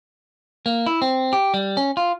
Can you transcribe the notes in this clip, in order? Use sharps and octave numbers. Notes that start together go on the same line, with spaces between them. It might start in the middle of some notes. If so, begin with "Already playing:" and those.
A#3
E4
C4
G4
G3
C#4
F4